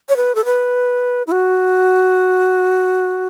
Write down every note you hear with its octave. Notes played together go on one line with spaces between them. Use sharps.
C#5
B4
A4
B4
E4
F#4